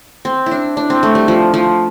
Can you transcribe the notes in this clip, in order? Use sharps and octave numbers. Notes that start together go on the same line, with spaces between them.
C4
E4
D4
D4
C4
A3
G3
F3
F3